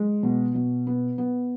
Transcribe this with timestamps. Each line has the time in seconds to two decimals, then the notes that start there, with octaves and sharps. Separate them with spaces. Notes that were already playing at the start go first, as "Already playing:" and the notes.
Already playing: G#3
0.23 B2
0.55 B2
0.87 B3
1.18 B3